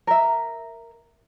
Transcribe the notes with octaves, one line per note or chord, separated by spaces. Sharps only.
A#4 E5